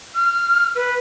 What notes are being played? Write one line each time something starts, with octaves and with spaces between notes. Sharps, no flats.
F6
B4